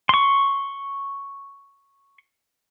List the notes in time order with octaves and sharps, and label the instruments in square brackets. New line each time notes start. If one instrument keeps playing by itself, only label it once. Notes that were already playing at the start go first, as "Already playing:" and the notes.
[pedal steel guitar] C6 C#6